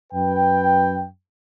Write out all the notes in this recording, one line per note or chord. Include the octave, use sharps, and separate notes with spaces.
F#2 B4 G5